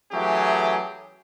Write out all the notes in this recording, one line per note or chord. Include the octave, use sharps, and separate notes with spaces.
E3 F#3 A3 C#4 G4 G#4